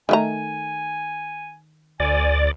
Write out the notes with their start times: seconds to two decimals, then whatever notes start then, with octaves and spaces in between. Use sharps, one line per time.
0.09 D#3 A3 G#5 A#5
2.00 D2 D5 G#5